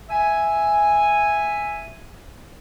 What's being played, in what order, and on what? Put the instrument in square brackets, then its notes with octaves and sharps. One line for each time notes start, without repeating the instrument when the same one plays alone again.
[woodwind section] E5 G#5